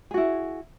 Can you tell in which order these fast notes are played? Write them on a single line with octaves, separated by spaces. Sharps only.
G#4 F#4 E4